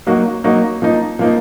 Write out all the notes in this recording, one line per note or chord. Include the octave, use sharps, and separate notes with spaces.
F#3 A#3 D#4 F#4
F#3 A#3 D#4 F#4
F3 A#3 D#4
F3 A#3 D#4